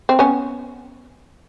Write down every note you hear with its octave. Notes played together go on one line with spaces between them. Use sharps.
C4
B3 C#4